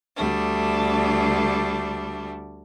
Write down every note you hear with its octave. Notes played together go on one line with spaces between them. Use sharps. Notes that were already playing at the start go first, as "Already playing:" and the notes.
D2 G3 A3 D4